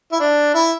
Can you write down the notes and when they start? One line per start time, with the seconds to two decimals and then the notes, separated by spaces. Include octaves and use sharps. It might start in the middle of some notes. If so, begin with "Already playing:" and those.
0.12 E4
0.20 D4
0.54 E4